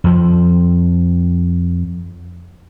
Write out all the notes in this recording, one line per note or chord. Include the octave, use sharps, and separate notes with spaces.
F2 F3